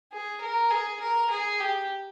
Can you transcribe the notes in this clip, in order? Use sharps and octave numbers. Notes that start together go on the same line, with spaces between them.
G#4
A#4
G#4
A#4
G#4
G4